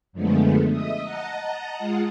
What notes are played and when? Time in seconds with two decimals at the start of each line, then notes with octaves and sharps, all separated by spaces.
0.13 F#2 D3 F3 G#3 A3 B3
0.69 D#5 E5 D#6
1.03 D#5 F#5 A5 A#5
1.78 G#3 F4 F#5